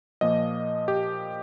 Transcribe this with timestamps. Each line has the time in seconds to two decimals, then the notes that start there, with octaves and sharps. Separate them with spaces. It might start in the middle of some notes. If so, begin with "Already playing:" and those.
0.21 A#2 F3 A#3 D#5
0.88 G4